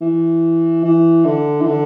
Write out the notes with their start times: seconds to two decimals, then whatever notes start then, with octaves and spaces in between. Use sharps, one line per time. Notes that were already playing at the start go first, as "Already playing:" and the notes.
0.01 E3
0.84 E3
1.25 D3
1.61 E3
1.67 D3